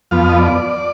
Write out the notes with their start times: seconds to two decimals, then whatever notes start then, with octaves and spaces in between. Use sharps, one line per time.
0.11 F2 F3 B3 F5
0.29 D#5
0.39 D5